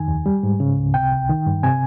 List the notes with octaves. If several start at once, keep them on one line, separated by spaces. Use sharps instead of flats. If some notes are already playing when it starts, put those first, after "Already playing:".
Already playing: F2 D#3 G#5
D#2
G3
G#2
C#3
C#2
C3 G5
C2
D#3
G2
C3 G#5